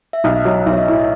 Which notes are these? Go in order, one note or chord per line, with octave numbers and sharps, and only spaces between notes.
E5
B1 D#5
F#3 D#5
B1 E5
C#5
D#5
A2 E5
D#5